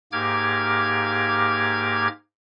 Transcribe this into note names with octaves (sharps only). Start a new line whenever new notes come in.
G#2 A#3 G4 D6 F6 G#6